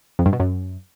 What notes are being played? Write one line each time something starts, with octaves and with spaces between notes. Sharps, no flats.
F2
G2
B2
F#2